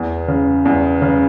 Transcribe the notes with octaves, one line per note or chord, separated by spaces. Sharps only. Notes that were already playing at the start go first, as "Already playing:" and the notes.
Already playing: E2
C#3
E2
C#3